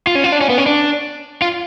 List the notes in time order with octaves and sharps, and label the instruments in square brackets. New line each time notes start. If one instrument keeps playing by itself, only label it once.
[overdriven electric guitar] F4
C#4
F4
D4
C#4
B3
C#4
D4
F4